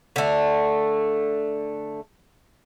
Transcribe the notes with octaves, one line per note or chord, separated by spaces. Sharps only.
D3 A3